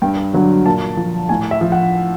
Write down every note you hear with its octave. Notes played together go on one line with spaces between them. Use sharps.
G2 G5
D3 F#3
A#2 A5
F3
A2 G#5
E5
F3
F#5